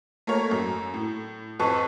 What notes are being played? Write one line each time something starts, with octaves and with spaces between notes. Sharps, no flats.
A3 A#3 A#4 C#5
F#2
A2
F2 B4 A5 C#6